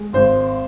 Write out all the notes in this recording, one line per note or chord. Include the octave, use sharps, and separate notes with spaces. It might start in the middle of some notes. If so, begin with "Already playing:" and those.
Already playing: G#3
G#1 C5